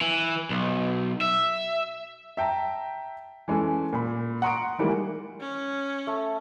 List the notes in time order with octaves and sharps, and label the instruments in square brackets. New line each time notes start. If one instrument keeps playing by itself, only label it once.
[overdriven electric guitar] E3
B1
E5
[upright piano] E5 G5 A5 A#5
E3 G#3 C#4 A4
A#2 B5
F#5 A#5 C6 C#6 D#6 D7
D#3 E3 G3 G#3 A#3 E4
[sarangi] C#4
[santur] A3